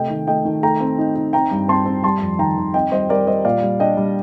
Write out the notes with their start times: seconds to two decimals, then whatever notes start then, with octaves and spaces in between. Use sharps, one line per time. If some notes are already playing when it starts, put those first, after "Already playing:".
Already playing: C3 A3 D#5 G5
0.10 D#3
0.27 A3 D#5 G5
0.45 D#3
0.63 A3 G5 A#5
0.80 C4
0.99 D#4
1.15 D#4
1.33 C4 G5 A#5
1.51 G2
1.68 C4 A5 C6
1.86 C4
2.04 G3 A5 C6
2.21 F2
2.39 D#3 G5 A#5
2.57 D#3
2.74 C4 D#5 G5
2.91 G3 C5 D#5
3.09 G3 A#4 D5
3.27 G3 C5 D#5
3.45 A#2 D5 F5
3.63 G3
3.80 D4 D#5 G5
3.97 G3